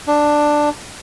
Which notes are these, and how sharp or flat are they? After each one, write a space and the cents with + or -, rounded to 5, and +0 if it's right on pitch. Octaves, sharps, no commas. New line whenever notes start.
D4 +10